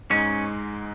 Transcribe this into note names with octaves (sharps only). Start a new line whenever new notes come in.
G#2 G#3 C#4 D#4